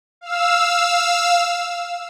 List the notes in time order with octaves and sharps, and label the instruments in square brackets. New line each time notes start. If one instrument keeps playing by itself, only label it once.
[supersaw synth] F5 E6